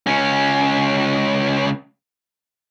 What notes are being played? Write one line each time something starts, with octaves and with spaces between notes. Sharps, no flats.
C#2 C#4